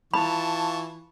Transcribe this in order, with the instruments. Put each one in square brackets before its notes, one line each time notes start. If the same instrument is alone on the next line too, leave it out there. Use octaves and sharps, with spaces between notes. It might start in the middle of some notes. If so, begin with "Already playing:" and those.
[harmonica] E3 F4 C#6 [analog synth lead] A5 [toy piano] B5